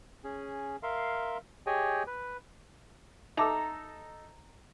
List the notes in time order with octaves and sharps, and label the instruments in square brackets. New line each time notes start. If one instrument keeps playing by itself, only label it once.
[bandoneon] C#4 G#4
A#4 E5 F5 C6
G4 G#4 C#5 D#5 G5 G#5
B4
[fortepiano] D#4 A4 [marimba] E5 A5 D6 [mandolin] A#5